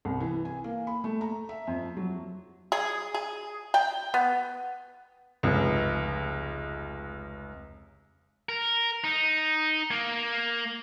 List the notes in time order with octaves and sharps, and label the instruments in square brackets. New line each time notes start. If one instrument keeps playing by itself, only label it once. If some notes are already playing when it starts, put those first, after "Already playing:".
[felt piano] C2
E3
G#5
A#3
B5
A3
A#5
E5
F2
F#3
[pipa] G#4
G#4
G5
B3
[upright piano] F1 C#2
[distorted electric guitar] A#4
D#4
A#3